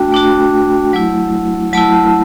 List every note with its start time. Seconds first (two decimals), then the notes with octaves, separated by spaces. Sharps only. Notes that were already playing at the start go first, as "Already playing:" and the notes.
Already playing: A3 D4 F#4 G5
0.12 A3 D4 F#4
0.93 F#3 A3 E4
1.73 F#3 A3 E4 A5